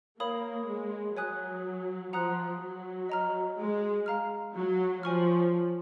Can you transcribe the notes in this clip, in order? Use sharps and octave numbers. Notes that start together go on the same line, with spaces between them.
A#3 A#4 C#5 F5 B5 D#6
G#3
F#3 C#5 G#5 D#6 F#6
F3 F#5 A#5 D#6 F#6
F#3
D#5 A#5 F6
G#3
F5 A#5 F6
F#3
F3 C#5 G#5 C#6 F6